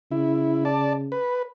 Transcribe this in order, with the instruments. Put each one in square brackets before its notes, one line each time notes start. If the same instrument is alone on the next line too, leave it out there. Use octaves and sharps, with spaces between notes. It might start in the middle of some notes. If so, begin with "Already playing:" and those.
[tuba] C#3 [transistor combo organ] E4
[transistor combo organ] D5 A5
B4